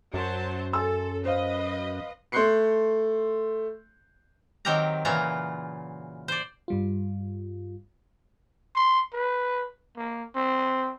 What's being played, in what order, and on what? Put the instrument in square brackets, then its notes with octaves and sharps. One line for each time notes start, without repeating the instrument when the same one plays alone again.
[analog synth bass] F#2 [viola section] F#3 C5 A5
[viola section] A4 [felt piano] G#5 C6 E6
[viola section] B4 D#5 [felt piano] C5 F5
[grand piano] A3 C6 F#6 G6 C7 C#7
[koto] D#3 F#3 C4 G4 A#4 A#5
A#2 C#3 E3 F#3 F4 A#5
C5 D5
[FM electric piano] G2 G3 F4
[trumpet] C6
B4
A#3
C4